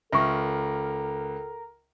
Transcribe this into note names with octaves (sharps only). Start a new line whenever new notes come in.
C#2 A4 A#4 E5 C#6